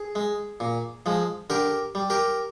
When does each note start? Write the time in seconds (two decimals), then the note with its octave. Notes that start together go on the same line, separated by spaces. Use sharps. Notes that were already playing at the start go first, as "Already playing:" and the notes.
Already playing: G#4
0.15 G#3
0.60 A#2
1.06 F3 G#3
1.50 D3 G4 A#4
1.95 G3
2.10 G4 A#4